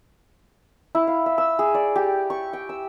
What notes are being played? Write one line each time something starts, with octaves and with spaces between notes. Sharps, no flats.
E4
F5
E5
E6
G#4
D5
G4
C#6
G5
E6